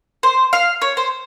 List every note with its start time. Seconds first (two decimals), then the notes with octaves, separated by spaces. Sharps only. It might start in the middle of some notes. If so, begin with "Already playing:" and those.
0.23 C5
0.53 F5
0.82 C#5
0.97 C5